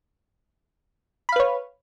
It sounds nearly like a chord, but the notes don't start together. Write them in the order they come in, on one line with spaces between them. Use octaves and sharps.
B5 F5 B4 C#5